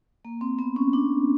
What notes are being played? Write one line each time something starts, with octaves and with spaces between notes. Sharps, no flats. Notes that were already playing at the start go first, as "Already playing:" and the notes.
A#3
C4
B3
C#4
D4